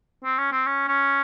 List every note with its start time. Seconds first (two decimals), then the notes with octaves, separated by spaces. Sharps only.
0.24 C4
0.38 C#4
0.52 C4
0.66 C#4
0.88 C#4